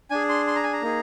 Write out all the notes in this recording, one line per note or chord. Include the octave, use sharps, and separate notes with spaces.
D4 G#4 G#5
C6
C6
A#5
G#5
A#5
A#3 D#4 G#4